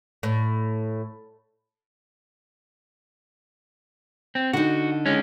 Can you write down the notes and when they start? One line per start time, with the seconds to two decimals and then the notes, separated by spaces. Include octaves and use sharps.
0.23 A2
4.35 C4
4.53 D3 D#4 F#4
5.06 G#3 C#4